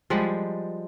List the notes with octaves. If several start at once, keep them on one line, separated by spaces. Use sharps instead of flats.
F3 G3 G#3 F#5